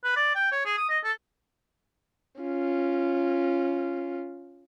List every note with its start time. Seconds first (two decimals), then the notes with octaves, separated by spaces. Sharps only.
0.04 B4
0.16 D5
0.35 G5
0.52 C#5
0.65 G#4
0.77 D#6
0.89 D#5
1.04 A4
2.41 C#4 F4